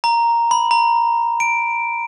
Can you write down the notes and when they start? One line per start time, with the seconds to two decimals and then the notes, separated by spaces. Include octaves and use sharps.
0.04 A#5
0.51 B5
0.71 A#5
1.40 D7